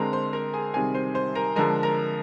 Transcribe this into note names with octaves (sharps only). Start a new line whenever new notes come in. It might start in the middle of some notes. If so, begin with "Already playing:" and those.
Already playing: D3 G#3 C4 A#4 A#5
C5 C6
A#4 A#5
G#4 G#5
C3 D#3 G3 C4 G#4 G#5
C5 C6
C5 C6
A#4 A#5
D3 F3 G#3 A#4 A#5
A#4 A#5